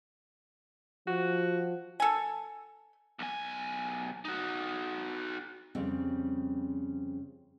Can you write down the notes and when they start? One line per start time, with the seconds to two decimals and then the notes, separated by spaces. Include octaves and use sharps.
1.07 F3 F#4
2.00 A4 G#5
3.19 B1 G#5
4.25 D#4 F#4
5.75 F2 C#3 G3 C4 C#4